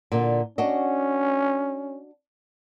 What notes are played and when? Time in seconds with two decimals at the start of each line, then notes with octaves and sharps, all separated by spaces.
0.12 A#2 D3
0.58 C#4 D4 F#4 D#5